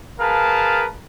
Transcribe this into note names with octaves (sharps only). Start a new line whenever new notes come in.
G#4 A#4 B4 F5 A5